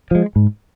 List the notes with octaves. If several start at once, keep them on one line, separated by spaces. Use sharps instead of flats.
F3 G#3
G#2